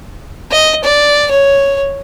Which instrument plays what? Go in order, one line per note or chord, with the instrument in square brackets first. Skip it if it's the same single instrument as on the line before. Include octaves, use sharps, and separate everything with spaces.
[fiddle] D#5
D5
C#5